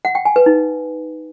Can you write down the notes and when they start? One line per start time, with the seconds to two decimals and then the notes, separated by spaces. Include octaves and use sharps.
0.05 F#5
0.15 G5
0.25 G#5
0.36 B4
0.46 D#4